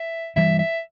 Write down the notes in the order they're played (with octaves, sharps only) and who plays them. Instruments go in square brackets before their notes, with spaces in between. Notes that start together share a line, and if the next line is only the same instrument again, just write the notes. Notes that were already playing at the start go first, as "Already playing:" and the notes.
Already playing: [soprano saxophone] E5
[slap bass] G2 E3 G3 [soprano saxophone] E5
[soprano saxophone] E5